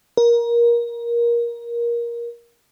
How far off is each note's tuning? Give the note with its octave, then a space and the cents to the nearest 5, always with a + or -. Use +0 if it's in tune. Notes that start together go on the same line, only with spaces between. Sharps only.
A#4 +20